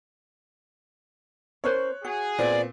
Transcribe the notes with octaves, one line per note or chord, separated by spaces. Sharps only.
C#4 A#4 C5 C#5 F#6
F#4 G#4
A#2 B3 C4 D5